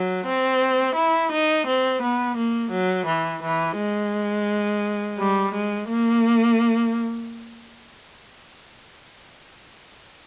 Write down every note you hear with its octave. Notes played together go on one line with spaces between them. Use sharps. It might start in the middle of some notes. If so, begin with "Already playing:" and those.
Already playing: F#3
C4
E4
D#4
C4
B3
A#3
F#3
E3
E3
G#3
G3
G#3
A#3